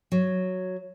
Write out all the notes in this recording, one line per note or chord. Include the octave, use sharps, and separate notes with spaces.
F#3